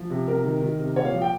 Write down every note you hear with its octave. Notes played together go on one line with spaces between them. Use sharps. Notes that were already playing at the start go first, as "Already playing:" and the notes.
Already playing: F3
C3
C3 A#4
D#3
D#3
C3
A#2 C#5
F5
F3
G5